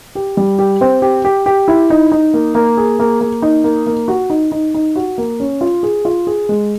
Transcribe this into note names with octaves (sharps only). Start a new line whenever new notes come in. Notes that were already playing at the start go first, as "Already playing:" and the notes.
G4
G3
G4
C4
G4
G4
G4
E4
D#4
D#4
A#3
A#3
G#4
A#3
A#3
D#4
A#3
A#3
F#4
D#4
D#4
D#4
F#4
A#3
C#4
F4
G#4
F4
G#4
G#3